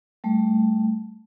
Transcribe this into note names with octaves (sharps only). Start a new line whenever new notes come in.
G3 A3